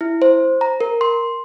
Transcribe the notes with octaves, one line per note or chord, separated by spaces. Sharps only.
E4
C5
A#5
A#4
C6